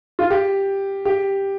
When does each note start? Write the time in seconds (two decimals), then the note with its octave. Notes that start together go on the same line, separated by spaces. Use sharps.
0.19 F4
0.30 G4
1.05 G4